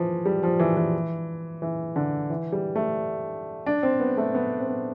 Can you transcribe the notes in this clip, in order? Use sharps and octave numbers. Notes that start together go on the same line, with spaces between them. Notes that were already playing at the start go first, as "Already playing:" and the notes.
Already playing: E3 F3
G3
F3
E3
E3
E3
D3
E3
G3
A3
D4
C4
B3
A3
B3
C4
B3